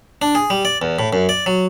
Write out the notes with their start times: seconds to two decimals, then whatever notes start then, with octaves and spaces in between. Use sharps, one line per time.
0.22 D4
0.35 G#4
0.50 G3
0.65 D5
0.82 E2
0.99 A2
1.13 F#2
1.29 D5
1.46 F#3